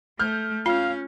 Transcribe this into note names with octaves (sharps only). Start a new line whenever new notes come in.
A3 F6 G6
C#4 F4 F5